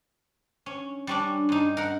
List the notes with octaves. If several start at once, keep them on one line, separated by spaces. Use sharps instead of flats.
C#4
G3 C#4 D4
G2 D#4
A#4 F#5